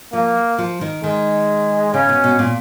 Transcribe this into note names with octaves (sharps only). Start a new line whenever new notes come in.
F3 A#3
F3
D#3
D#3 G#3
C#3 C#4
B2
B2
A#2